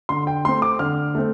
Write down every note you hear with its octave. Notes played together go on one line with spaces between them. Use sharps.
D3 C6
G5
A3 C4 C6
D6
D3 F6
A3 C4